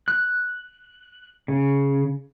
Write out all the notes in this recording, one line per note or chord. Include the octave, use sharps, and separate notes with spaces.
F#6
C#3